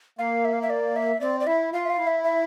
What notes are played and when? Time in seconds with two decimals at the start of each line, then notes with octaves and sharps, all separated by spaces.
0.19 A#3 F5
0.45 E5
0.53 F5
0.62 E5
0.70 D5
0.96 E5
1.21 C4 D5
1.40 D5
1.47 E4 E5
1.73 F4 F5
1.86 E5
1.90 F5
1.98 E4
2.07 E5
2.24 E5